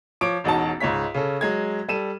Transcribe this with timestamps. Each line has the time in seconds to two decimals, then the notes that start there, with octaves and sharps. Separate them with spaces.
0.21 F3 C#5 D6 D7
0.44 E1 A1 D#4 F#4 A5
0.80 C#2 G#2 C#5 B6
1.14 C#3 C#4 A4
1.41 F#3 G#3 G#6
1.88 G3 A4 D#7 E7